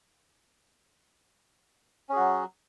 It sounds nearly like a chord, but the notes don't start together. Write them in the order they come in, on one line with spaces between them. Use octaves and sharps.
C#4 G#4 F#4 F#3